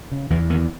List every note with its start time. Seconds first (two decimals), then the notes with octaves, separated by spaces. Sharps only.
0.12 C#3
0.30 E2 E3
0.50 E2 D#3